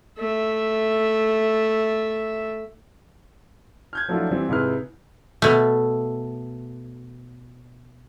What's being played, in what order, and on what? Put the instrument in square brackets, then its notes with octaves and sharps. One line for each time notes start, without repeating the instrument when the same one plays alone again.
[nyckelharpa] A3 E5
[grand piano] F6 G6 G#6
F3 F#3 A3 D4 E4 F4
E3 G3 C4 E4
G#2 C3 E4 G#4 B4 F6
[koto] B2 A3